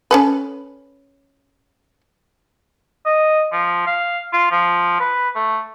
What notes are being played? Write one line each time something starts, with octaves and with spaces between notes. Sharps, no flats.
C#4 A4 B4
D#5
F3
F5
F4
F3
B4
A3